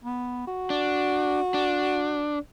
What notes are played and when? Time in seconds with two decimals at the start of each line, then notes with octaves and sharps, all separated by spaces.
0.04 B3
0.48 F#4
0.70 D4
1.54 D4